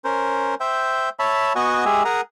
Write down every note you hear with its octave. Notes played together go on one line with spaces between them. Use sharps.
C#4 A#4 C5
C5 E5 G5
C#5 E5 A5 B5
B3 F#4 D#5 F#5 G#5 C#6
G#3 G4 G#4 E5 G#5
G#4 A#4 F#5 G#5 A#5